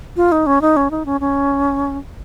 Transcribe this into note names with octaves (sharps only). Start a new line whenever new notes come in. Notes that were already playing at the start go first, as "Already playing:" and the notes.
F4
D#4
C#4
D#4
C#4
D#4
C#4
C#4